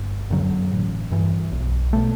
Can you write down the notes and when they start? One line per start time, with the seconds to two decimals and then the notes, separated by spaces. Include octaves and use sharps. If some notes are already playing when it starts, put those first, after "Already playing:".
Already playing: G1
0.31 F#2 D3 F#3
0.72 A1
1.12 G2 E3
1.52 B1
1.93 B2 A3